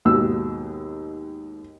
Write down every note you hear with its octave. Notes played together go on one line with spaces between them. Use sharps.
D#2 G#2 B2 E6